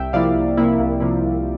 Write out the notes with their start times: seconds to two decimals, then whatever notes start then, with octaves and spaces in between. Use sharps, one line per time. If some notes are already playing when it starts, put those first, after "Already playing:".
Already playing: C2 E5 G5
0.13 C3 F3 A#3 E4 D5 F5
0.35 C2
0.57 C3 F3 A#3 E4
0.80 C2
1.00 C3 F3 A#3 E4
1.23 C2